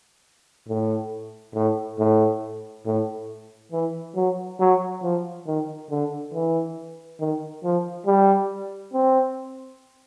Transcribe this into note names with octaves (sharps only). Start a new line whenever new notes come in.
A2
A2
A2
A2
E3
F#3
F#3
F3
D#3
D3
E3
D#3
F3
G3
C4